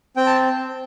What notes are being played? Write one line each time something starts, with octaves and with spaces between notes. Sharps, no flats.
C4 G5
A5